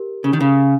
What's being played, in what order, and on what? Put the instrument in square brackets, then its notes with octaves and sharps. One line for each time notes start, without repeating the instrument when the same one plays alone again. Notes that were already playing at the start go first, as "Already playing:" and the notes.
Already playing: [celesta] G4 A#4
[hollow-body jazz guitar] C#3
D#3
C#3